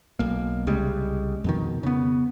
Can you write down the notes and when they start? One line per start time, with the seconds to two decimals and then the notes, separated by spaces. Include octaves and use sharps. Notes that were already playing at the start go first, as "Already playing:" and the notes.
0.19 B1 A#3
0.67 C2 C#3 G3 G#3
1.44 F2 B2 D#3
1.83 C#3 B3